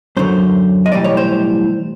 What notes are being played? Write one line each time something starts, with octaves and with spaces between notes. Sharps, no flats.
F#2 D3 F#3 C5
D#5
B1 A2 E3 G3 D5
C#5
C5